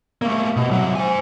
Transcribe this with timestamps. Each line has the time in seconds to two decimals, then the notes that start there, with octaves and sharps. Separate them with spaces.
0.22 A3 A#3
0.56 B2
0.71 C2 F#3
0.96 C5 G#5